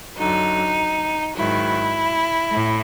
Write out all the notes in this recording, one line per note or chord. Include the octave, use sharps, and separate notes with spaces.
F#2 D3 F#3 D#4
G#2 D#3 F#3 E4
A2